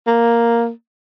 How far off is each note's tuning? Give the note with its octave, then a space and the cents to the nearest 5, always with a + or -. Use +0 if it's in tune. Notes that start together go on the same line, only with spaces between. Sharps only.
A#3 +0